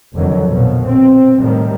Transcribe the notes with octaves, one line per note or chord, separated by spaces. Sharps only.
F1 F2 D3 D#3 F#3
A#1 B2 F3
C4
A2 D#3 G3